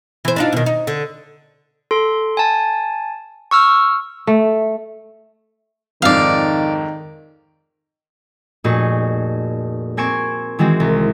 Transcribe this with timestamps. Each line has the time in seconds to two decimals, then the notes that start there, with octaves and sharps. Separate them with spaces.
0.25 E3 C5
0.36 D4 D#4 F4
0.53 B2 D#3
0.66 D#4
0.87 D3
1.91 A4 C6
2.37 G#5 A5
3.51 C#6 E6 F6
4.27 A3
6.02 F2 G#2 D#3 D5 F5
8.64 F1 A#2 D#4 F#4 G#4 C#6
9.97 A#3 C4 G#5 C#6 D7 E7
10.59 D#3 E3 G#3 C4 F#4
10.80 C2